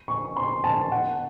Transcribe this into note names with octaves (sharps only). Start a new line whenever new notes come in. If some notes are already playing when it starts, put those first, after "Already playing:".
C#6
C6
A5
F#5